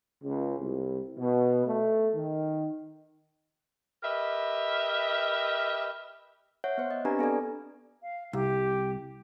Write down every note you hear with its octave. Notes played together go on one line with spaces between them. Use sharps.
C#2
C2
B2
A3
D#3
G4 A#4 B4 D#5 E5
C#5 E5 F#5 G6
B3 C5
D#5
C4 D4 G4 B4 G#5 A#5
B3 A4 D5 G#5
F5
C2 G4